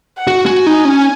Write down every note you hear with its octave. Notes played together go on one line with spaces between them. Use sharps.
F#5
F#4
F#4 G#5
D#4
C#4